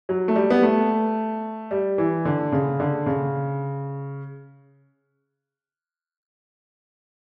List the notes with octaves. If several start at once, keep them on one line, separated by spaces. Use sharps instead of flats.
F#3
A3
G3
B3
A3
G3
E3
D3
C#3
D3
C#3